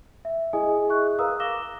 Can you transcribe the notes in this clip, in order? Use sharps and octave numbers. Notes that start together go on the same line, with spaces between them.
E5
E4 G#4 D#5 G#5 D#6
G#4 E5 C#6 F#6
A#4 B4 F5 A#5 D#6 E6
F5 D6 A#6 E7 G7